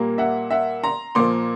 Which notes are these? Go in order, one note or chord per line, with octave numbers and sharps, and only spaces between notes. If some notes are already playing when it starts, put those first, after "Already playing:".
Already playing: A#2 G3 A#3
E5 F#5
E5 F#5
A#5 C6
A#2 F3 A#3 C6 D6